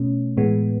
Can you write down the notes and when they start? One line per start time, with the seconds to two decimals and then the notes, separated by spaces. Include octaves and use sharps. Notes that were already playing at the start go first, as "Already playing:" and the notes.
Already playing: B2 A3 C#4
0.37 A2 E3 G#3 B3